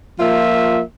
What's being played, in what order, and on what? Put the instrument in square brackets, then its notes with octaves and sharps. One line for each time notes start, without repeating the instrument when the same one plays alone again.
[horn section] F3 A#3 F4 E5